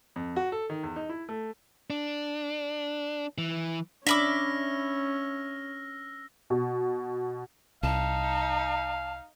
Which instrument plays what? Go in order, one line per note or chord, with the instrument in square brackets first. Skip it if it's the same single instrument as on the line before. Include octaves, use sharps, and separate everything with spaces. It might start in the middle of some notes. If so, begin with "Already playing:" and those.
[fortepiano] F2
F#4
A4
D#3
E2
D#4
E4
A3
[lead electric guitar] D4
E3
[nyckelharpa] C#4 [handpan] D4 [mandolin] E5 B5 D6 [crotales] E6 F6 A#6
[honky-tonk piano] B2
[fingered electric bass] C2 [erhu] D#4 [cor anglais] F5 [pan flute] A5